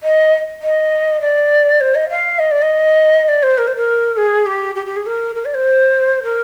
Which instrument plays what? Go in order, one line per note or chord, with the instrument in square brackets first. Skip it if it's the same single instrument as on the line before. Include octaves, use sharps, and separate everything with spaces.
[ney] D#5
D#5
D5
C5
D#5
F5
D#5
D5
D#5
D5
C5
A#4
C5
A#4
G#4
G4
G4
G4
G#4
A#4
A#4
D5
C5
A#4